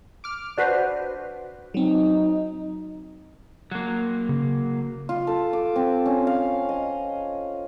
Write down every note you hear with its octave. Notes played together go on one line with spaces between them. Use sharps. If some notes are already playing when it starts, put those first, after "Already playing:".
D6 F6
D4 F#4 B4 C5
F#3 C4 D#4
F#3 A#3
C#3
F4
A4
D6
C4
C#4
F5
D#5